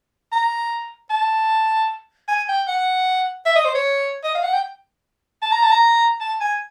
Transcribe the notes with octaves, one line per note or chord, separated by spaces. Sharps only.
A#5
A5
G#5
G5
F#5
E5
D#5
C5
C#5
D#5
F5
F#5
G5
A5
A#5
A5
A#5
A5
G#5